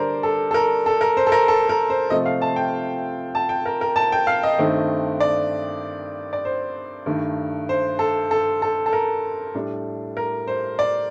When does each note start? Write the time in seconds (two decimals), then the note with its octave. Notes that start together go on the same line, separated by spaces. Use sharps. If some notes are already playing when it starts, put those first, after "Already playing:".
Already playing: D3 G3 D4 A#4 C5 D5
0.23 A4
0.51 A4
0.54 A#4
0.86 A4
1.01 A#4
1.17 C5
1.27 A4
1.32 A#4
1.48 A4
1.69 A#4
1.90 C5
2.10 C3 F3 A3 C4 D#5
2.26 F5
2.42 A5
2.56 G5
3.35 A5
3.49 G5
3.66 A#4
3.81 A#4
3.96 A5
4.12 G5
4.27 F5
4.43 D#5
4.58 G2 D#3 A3 C4
5.20 D5
6.33 D5
6.45 C5
7.06 G2 D#3 A3
7.69 C5
7.99 A4
8.31 A4
8.62 A4
8.86 A4
8.93 A#4
9.54 A2 G3 D4
10.17 A#4
10.47 C5
10.79 D5